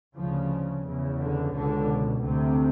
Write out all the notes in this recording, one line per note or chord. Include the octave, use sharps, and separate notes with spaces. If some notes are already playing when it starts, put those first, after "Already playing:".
D2 C#3 F3
E2 C#3
D3
C#2 B2 D3
D2 C3